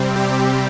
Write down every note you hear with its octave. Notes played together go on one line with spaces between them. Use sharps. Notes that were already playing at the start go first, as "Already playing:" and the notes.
Already playing: C3 G3 C4
G4